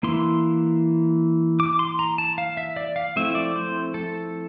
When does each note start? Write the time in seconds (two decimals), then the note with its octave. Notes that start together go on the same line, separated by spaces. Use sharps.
0.03 E3 A#3 E4 C6
1.60 D6
1.79 C6
1.99 A#5
2.18 A5
2.38 F5
2.57 E5
2.76 D5
2.96 F5
3.16 F3 A3 C4 E4 E5
3.35 D5
3.56 C5
3.94 A4